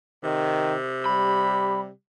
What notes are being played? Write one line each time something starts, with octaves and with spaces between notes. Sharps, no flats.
C3 D#3
G3 B5